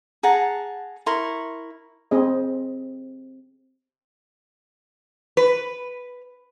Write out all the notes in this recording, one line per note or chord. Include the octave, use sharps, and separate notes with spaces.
G#4 F#5 A5 A#5
E4 A#4 C6 C#6
C4 G#4 D#5
B4